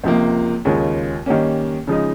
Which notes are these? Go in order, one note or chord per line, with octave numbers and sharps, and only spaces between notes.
C#2 C3 F3 A#3
D#2 C#3 G#3 C#4 F4
D#3 G3 A#3 C#4
C#3 F3 G#3 D#4